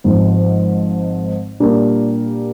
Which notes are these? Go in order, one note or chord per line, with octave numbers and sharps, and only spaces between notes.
G#1 G#2 F3
A#2 G3 D4 G4 A#4